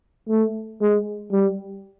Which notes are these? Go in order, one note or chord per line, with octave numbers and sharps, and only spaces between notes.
A3
G#3
G3